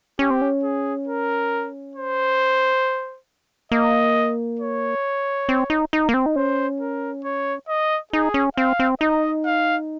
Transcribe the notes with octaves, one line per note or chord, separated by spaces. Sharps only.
C#4 G4
C4
C#4
G#4
A#4
C5
A#3 D#5
C#5
C4
D#4
D#4
A#3
C4
D#4
C#4 C5
A#4
C#5
D#5
D#4 G#4
C#4
C4 F5
C4
D#4 D#5
F5